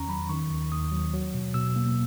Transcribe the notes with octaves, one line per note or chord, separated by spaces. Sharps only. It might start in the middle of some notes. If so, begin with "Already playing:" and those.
Already playing: E2 D#3 C#4 A#5 C#6
F#3 B5
D#3 C#6
D#2
D#2 D#6
F#3
F#3
B2
B2 E6
A#3